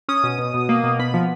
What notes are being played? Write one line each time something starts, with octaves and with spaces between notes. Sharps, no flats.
C#4 D#6
B2
B2
B2
A#3
B2
B3 B5
F3